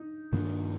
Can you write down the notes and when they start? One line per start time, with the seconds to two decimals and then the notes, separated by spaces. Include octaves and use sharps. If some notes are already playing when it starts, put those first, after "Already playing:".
Already playing: D#4
0.32 G2 D#3 A#3 D4